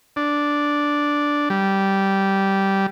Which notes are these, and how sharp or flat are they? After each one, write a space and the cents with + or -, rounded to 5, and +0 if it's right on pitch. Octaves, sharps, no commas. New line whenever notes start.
D4 -5
G3 -10